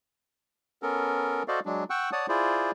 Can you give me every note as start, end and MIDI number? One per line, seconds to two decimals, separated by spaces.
0.82 1.43 59
0.82 1.43 61
0.82 1.43 69
0.82 1.43 70
1.48 1.60 66
1.48 1.60 69
1.48 1.60 72
1.48 1.60 74
1.48 1.60 75
1.48 1.60 77
1.66 1.84 54
1.66 1.84 56
1.66 1.84 62
1.90 2.10 78
1.90 2.10 79
1.90 2.10 85
1.90 2.10 88
1.90 2.10 90
2.12 2.26 73
2.12 2.26 74
2.12 2.26 78
2.12 2.26 81
2.12 2.26 87
2.29 2.71 64
2.29 2.71 65
2.29 2.71 68
2.29 2.71 72
2.29 2.71 74